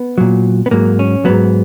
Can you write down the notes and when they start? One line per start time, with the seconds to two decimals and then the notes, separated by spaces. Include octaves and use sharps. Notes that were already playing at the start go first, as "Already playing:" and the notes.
Already playing: B3
0.18 A#2 F#3
0.66 B3
0.71 G#2 F#3 A#3
0.99 C#4
1.25 G#2 F#3 B3